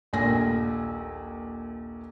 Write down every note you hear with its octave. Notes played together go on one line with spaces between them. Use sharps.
D#1 A#1 A#2 G#5 A#6